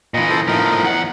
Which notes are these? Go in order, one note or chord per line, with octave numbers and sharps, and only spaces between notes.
A#2 E3 D#5
A4 C5
A2 F3 D#4 A#4
E2 F#5